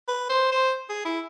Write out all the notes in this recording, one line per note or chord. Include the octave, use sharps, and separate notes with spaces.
B4
C5
C5
G#4
E4